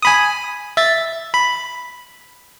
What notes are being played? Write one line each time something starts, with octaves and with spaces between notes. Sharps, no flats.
G#5 B5 D#6
E5 A6
B5